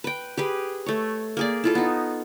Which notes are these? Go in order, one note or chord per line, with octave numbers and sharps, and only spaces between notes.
B4 G5
G4 G#4 B4
A3 C#5
A#3 G#4 D5
E4 F4 A4
B3 D#4